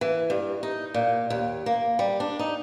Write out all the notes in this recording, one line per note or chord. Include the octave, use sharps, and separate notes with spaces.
E3
G2
D#4
A#2
D#2
A#3
G3
D4
D#4